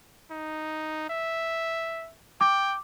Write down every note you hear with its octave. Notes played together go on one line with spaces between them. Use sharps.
D#4
E5
G5 D6